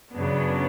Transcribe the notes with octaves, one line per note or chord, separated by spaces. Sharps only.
F#2 C#3 F#3 B3 D4